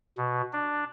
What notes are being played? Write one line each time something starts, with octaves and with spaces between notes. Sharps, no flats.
B2
D4